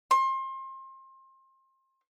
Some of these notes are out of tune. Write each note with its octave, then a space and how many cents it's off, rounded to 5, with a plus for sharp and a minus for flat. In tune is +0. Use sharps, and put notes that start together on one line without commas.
C6 +30